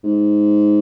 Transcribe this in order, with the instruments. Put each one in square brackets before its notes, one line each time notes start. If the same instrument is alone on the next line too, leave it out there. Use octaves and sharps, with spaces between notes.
[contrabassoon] G#2